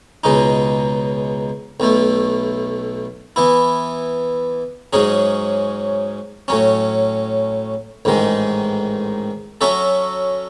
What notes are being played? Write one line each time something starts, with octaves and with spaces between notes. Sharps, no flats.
C#2 B2 G#3 D#4
B1 B2 A3
E3 B3 E4
G#2 F#3 C#4 G#4
A2 F#3 C#4
A1 G#2 D#3 G#3
F#3 C#4 F#4 A4 E5